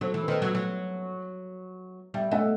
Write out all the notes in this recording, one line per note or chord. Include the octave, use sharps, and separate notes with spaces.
F#3 A4 C5
E3
B4
D#3 A4 C5
F#3
F#3
G3 E5 G5
A3 D#5 F#5